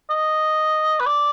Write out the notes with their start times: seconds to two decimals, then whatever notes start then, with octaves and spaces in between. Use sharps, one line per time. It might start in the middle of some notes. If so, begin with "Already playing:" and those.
0.10 D#5
1.00 B4
1.06 D5